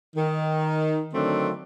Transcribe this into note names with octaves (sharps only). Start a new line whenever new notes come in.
D#3
D3 D#3 F#3 A3 C4 D4